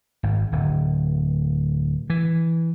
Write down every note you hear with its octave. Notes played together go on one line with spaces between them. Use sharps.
G#1
D1
E3